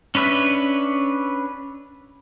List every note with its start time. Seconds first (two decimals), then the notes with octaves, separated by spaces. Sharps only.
0.15 C#4 D4 B4 E5